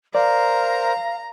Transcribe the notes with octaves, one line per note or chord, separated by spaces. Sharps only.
A#4 C5 D5 F5 A#5